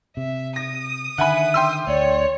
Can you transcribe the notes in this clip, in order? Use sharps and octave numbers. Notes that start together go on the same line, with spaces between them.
C3 E5
D#6 A#6
D3 D#3 E5 F#5 G#5 B5
G5 C6 E6
D2 C#5 D5